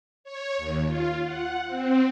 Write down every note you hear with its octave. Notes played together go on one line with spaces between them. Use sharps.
C#5
D#2
F4
F#5
C4